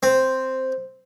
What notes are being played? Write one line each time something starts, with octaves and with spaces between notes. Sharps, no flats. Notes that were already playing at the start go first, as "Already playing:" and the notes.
C4